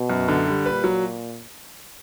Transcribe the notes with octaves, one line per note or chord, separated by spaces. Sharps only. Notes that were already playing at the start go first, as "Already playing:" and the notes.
Already playing: B2
F#2
D3
G3
A#2 B4
F#3